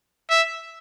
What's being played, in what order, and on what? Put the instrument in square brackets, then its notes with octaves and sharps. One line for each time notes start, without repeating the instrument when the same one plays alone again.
[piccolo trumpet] E5